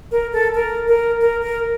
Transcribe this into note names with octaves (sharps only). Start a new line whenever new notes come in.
A#4
A4
A#4
A#4
A#4
A#4